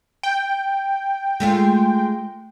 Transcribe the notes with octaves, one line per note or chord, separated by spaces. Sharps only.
G5
G#3 A3 F4